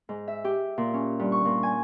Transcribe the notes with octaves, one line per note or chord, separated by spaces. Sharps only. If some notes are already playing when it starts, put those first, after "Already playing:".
G#2
E5
G4
A#2
C#4
G2
C#6
A#2
G#5